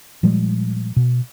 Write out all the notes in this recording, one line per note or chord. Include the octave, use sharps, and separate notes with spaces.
A#2 F3 G3 G#3
B2